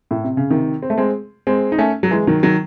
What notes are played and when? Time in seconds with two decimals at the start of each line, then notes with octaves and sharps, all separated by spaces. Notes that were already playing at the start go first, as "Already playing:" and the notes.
0.11 A2
0.24 C3
0.37 C#3
0.50 C3 D#3
0.83 C4
0.90 A3
0.98 G#3 C4
1.47 G#3 C4
1.72 D#4
1.78 A3 C#4
2.03 F#3
2.11 E3 G#3
2.27 D#3 F#3
2.43 D#3 F#3